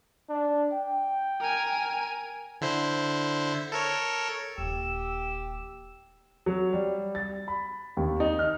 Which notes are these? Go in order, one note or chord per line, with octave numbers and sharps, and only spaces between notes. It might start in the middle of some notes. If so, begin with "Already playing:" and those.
D4
G5
A#4 G#5
D3 E4 C5
A4 A#4 C#5
D#1 E3 G4 E6
F#3
G3
A6
B5
D#2
D#4
F6